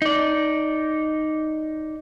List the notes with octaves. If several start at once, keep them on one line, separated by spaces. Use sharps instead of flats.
D#4 D5